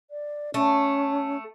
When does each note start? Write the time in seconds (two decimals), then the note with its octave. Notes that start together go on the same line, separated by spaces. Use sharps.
0.11 D5
0.54 A3 C#4